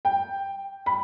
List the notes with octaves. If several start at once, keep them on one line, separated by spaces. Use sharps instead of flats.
G5
B5